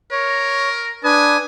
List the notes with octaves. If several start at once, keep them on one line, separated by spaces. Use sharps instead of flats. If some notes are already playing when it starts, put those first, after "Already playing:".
A#4 C#5
D4 B4 G#5 D#6